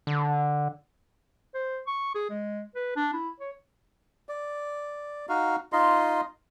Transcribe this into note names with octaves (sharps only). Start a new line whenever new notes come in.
D3
C5
C#6
G#4
G#3
B4
D4
E4
C#5
D5
D#4 F#4 F5
D#4 F4 D#5 C6